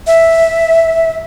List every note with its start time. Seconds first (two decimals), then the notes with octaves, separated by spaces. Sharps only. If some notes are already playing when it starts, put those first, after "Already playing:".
0.07 E5